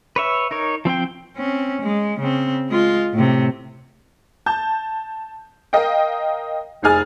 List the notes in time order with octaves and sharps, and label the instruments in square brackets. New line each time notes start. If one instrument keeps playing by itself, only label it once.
[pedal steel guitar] B4 C#5 E5
D#4 A#4 C#5
F3 C4 C5 G5
[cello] C4 C#4
G#3
C#3 C4
G#3 F4
A2 C3
[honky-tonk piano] A5 G6
A#4 D#5 F5 G5
F1 D#4 G#4 G#5 F6 A6